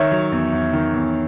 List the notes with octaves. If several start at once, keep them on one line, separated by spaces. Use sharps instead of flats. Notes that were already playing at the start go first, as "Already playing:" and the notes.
Already playing: D#3 C#5 E5
F#3
E2
E2
D#3
E2